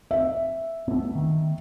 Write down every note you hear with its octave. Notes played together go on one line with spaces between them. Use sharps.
E5
A3 B3
D#3